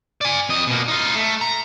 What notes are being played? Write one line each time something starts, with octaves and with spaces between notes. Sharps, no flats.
D5 G#5
F2 D#5
B2 A#3
D#4 F4
A3
A#5